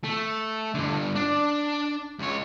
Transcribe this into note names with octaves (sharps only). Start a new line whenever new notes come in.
A3
G2 D3
D4
C#2 C#5